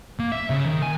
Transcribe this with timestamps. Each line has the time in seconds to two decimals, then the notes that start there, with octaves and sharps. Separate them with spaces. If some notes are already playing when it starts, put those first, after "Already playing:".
0.19 A#3
0.32 E5
0.50 C#3
0.65 D#3
0.83 G#5